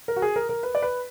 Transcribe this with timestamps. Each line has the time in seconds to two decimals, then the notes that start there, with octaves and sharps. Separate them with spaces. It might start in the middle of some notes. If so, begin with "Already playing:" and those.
0.08 A#4
0.16 F#4
0.22 G#4
0.36 A#4
0.49 A#4
0.63 B4
0.75 D5
0.82 B4